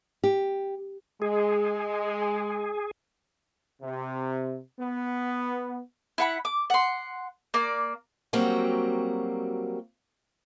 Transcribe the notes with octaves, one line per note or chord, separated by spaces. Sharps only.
G4
G#3 G#4
C3
B3
E4 F#5 B5
D6
F#5 C6
A#3 D5
F#3 G3 A#3 C4 F#4